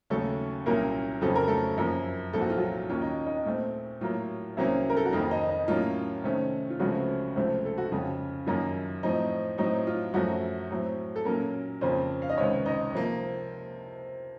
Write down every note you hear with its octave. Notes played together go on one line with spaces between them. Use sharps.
D#2 C#3 F#3 A3 A4
C2 A#2 F#3 A#3 C#4 A#4
F2 C#3 F#3 C4 A4
A#4
A3 A4
F#2 F3 A#3
C2 A#2 F3 A#3 A4
F#4
F4
F#3 F#4
D#2 D#3 A#3 C#4 F4
D#4
D#4
A#2 A3 C4
A2 F#3 A#3 F4
C2 C3 F#3 A#3 C#4
A#4
A4
F#4
F2 D#3 A#3 F4
D#4
D#4
A2 F#3 A#3 C#4 F4
C3 D#3 A3 C#4
F4
C#2 C#3 F3 F#3 A3 C4 F#4
C#2 C3 F3 A3 C4
A4
F#4
F2 C#3 F3 F4
F#2 D#3 F#3 A#3 F4
A2 F3 C4 D#4
A2 F#3 C4 D#4
F4
F#2 F3 F#3 A3 F#4
A2 F#3 C4
A4
A#2 F#3 A#3 C#4 A#4
F2 C#3 F3 A#3 C4 C5
F5
D#5
C#2 C3 D#3 C#4 C#5
D#4 D#5
C3 F3 A#3